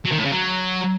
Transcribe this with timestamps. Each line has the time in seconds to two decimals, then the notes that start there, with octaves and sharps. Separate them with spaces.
0.05 F#3
0.11 D#3
0.18 A2
0.25 C#3
0.32 F#3